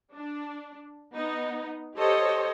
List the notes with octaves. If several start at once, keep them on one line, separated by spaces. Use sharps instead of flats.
D4
B3 D#4
G4 A4 C5 C#5 D#5